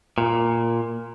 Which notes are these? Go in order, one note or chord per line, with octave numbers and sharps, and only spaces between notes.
A#2